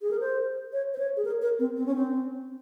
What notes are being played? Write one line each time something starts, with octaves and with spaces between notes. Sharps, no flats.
G#4
A#4
C5
C#5
C5
C#5
G#4
A#4
A#4
C4
C4
C#4
C4